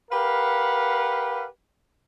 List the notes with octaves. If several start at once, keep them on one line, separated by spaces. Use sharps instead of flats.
G4 A#4 B4 F5 F#5